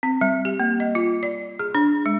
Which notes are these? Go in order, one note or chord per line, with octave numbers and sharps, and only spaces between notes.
C4
G3
G4
A#3
D#5
F4
D5
G#4
D4
G#3